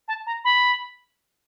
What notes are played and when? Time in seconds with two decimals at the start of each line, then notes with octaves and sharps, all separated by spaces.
0.08 A5
0.26 A#5
0.44 B5